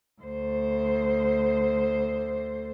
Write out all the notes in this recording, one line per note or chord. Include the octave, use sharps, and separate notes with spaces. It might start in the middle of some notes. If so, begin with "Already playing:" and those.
D2 C5